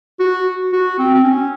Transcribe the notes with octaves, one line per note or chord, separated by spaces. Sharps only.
F#4
F#4
C4
C4
C#4